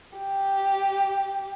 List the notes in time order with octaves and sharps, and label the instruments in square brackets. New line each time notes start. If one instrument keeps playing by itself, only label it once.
[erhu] G4